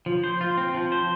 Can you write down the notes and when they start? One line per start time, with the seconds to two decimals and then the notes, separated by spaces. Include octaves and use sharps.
0.06 F3
0.24 C5
0.41 F4
0.57 C4
0.74 F3
0.92 C5